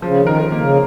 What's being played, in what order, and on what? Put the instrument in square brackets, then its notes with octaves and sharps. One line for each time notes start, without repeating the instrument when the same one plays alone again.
[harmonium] C#3 [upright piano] F3
[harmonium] D#3
[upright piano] A#4
[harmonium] D#3 [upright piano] A#3
[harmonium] C#3